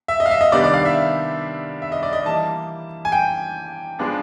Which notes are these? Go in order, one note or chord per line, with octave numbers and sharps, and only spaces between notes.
E5
D#5
F5
E5
D#5
C3 D#3 G3 B3 D4 D5
D5
F5
E5
E5
D#5
D5
D#5
E3 G3 A#3 A5
G#5
G5
F3 G#3 B3 D4 F4